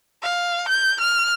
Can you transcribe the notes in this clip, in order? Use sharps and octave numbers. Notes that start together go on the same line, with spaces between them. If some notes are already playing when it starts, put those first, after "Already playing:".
F5
G6
F6